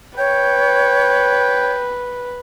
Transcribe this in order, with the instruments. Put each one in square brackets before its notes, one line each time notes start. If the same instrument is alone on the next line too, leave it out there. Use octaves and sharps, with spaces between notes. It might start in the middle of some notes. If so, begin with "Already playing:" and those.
[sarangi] B4 [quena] C#5 [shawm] G5